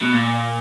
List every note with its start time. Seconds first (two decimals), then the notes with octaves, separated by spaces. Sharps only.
0.01 B2
0.13 A#2